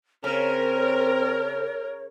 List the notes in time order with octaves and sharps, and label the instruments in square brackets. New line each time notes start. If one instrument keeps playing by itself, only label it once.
[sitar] C#3 [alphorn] C4 [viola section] A#4 [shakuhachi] C#5